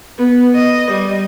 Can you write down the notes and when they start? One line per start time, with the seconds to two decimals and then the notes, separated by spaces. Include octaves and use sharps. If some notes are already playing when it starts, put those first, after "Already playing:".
0.19 B3
0.55 D#5
0.91 G3